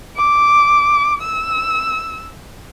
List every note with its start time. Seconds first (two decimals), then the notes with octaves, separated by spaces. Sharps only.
0.16 D6
1.22 E6